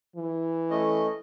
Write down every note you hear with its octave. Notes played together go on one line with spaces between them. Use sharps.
E3
A3 C#4 D#5